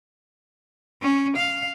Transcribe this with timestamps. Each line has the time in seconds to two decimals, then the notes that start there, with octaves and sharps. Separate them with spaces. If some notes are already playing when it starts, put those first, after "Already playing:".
1.02 C#4
1.36 F5